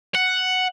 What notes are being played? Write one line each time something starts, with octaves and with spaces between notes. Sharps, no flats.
F#5